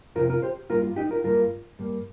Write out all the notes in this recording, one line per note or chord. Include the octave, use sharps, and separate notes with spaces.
F2 C3 F3 C4 F4 A#4
F4 A#4
G4 C5
G2 G3 A#3 F4 A#4
F4
D#4 G4
F4 A#4
G2 G3 A#3 F4 A#4
G2 G3 A#3